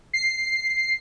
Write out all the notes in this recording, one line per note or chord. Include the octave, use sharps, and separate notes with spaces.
C7